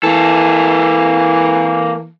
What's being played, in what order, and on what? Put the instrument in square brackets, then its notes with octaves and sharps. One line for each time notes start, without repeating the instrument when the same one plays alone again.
[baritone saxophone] E3 [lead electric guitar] A#3 A4